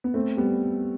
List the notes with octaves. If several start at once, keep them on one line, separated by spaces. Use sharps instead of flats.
B3
A3 C4
G3 B3